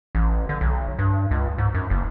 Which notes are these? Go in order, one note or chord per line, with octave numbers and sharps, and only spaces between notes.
A1
D3
B1
G2
C#2
G#2
F#2
F#1